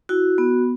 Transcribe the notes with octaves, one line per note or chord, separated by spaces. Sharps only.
E4 F#4
B3